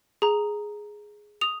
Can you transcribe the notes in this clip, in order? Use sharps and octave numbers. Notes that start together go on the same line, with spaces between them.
G#4 A#5
D#6 F7